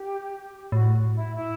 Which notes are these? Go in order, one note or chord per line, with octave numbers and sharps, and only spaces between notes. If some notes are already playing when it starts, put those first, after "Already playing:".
Already playing: G4
A2 F#4
E4
E4